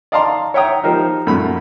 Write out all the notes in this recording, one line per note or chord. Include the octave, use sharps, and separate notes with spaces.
D5 D#5 F5 A5 A#5 C6
C#5 E5 F#5 G5 A#5 D#6
F3 D#4 G4 A#4 C5
F#2 A#2 A3 B5